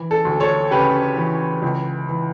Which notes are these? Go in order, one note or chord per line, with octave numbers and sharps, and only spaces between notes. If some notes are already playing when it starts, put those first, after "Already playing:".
Already playing: E3
A4
D2
A4 C#5
C#3 G4 B4
E3
C#2
E3